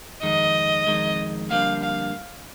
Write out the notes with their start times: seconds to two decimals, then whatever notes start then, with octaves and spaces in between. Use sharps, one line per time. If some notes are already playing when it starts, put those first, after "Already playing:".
0.23 F2 D#3 G#3 D#5
0.87 F2 D#3 G#3
1.50 F2 D3 G3 A#3 F5
1.83 F5